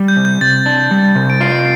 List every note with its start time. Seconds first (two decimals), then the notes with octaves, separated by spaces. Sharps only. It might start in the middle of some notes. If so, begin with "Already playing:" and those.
Already playing: G3
0.08 G6
0.16 C3
0.25 G6
0.41 C3 A6
0.66 D4
0.91 G3
1.16 C3
1.30 D7
1.40 F4 C7